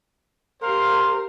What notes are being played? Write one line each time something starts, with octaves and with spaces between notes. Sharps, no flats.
G4 A#4 C5 F5 C6